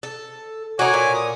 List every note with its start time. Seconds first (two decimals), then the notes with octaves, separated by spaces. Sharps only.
0.03 A4
0.79 D#4 F#4 C#5 G#5 D6
0.94 A#2
1.14 D#6